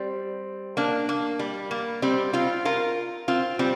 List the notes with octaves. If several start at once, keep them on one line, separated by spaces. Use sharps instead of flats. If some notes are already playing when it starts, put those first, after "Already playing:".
Already playing: G3 C4
A#3 D4
A#3
G3
A#3
G3 C4
C4 F4
F4 A#4
C4 F4
G3 C4